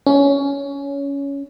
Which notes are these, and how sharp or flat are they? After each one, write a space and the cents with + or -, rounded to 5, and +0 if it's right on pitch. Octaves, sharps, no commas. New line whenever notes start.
C#4 +15